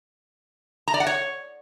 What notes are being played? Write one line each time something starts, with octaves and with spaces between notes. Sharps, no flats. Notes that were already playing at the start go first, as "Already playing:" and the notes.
A#5
D5
F#5
C#5